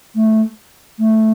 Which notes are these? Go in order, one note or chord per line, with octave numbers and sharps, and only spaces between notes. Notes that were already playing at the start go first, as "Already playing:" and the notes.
A3
A3